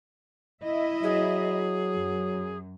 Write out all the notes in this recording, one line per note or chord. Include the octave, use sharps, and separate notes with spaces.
E4 D#5 E5
F#3 G#4
F#2